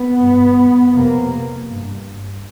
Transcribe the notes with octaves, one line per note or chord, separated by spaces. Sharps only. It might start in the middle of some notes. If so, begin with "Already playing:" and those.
Already playing: B3
G2
F2 C3 A#3
G2